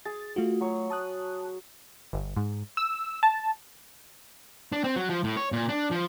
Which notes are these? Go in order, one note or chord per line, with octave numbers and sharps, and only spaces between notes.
G#4 A6
A3 F4 F#4
F#3 C#5
A5 D#6 F#6
G1
G#2
E6
A5
D4
C4
F#3
F3
A2
C#5
A#2
D4
F3